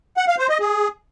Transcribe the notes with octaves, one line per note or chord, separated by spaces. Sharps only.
F#5
F5
C5
D#5
G#4